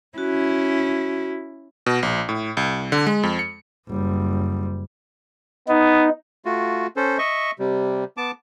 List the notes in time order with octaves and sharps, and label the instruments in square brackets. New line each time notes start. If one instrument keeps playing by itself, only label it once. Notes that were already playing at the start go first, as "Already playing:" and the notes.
[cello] C#4 E4 [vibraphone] F#4
[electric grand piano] B2
A#1
A2
C2
D3
G#3
F2
C#7
[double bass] F#1 G3
[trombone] B3 [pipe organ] D#4
[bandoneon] A3 F4 F#4
C#4 A4 C5
D#5 E5 C#6
C3 G3
B3 A5 D6